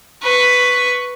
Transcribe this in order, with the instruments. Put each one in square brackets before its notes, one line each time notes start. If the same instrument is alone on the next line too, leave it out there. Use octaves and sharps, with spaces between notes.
[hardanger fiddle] B4 C#6